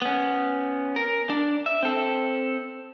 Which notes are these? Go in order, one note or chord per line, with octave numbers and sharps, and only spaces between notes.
B3 C#4
A#4
D4
E5
C4 A4